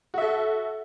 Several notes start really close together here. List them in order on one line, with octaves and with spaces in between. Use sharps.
F#4 E5 A4